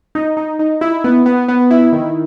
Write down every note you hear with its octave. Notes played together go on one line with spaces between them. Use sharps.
D#4
D#4
D#4
E4
B3
B3
B3
E4
D#3